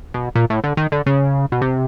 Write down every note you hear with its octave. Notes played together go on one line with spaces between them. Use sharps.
B2
A#2
A2
D3
D#3
D3
C#3
B2
C3